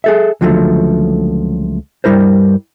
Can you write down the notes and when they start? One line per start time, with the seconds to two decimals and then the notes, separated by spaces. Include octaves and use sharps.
0.04 G#4 A4 E5
0.41 C#2 D3 F3 F#3 G#3 A3
2.04 G2 D#3 G3 E4 A#4 C5